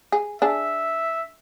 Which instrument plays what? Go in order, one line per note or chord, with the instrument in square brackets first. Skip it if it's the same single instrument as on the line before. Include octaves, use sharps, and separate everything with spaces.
[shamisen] G#4
[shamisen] D4 G#4 [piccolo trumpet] E5